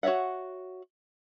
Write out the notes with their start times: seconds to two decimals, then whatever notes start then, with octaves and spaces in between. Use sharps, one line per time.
0.03 F#4 C#5 D5 E5 F#5